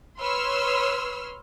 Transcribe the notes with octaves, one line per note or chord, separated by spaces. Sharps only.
B4 C#5 C6 E6 F6